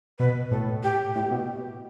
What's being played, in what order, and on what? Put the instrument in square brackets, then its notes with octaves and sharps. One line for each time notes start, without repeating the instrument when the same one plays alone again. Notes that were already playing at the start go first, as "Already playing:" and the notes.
[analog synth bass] B2 [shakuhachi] B4
[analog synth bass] A2 [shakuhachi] A4
[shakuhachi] G4
[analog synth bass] A2 [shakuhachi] G4
[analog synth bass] B2